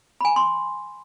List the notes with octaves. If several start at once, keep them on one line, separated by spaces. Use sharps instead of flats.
G#5 B5
C6